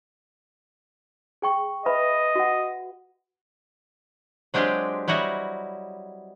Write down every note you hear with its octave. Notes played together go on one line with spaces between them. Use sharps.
G#4 G5 C#6
B4 D#5 E5 B5
F#4 F#5
F#3 G#3 C4 D4 F4 G4
F#3 G3 E4 F#4 D#5